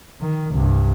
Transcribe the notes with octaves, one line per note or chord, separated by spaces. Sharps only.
D#3
C2 G2